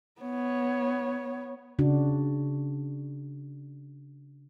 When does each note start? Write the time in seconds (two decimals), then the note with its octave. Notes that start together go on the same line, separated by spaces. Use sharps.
0.21 B3 C#5
1.79 C#3 D4 F#4